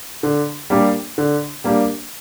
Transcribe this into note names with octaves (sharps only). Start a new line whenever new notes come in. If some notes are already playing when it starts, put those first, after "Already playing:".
D3
G3 A#3 D4 G4
D3
G3 A#3 D4 G4